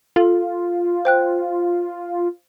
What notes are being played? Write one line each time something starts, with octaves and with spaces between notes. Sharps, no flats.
F4 A4
C5 G5 F#6